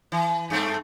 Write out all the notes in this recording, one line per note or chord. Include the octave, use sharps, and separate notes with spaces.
E3
G2 A3 C4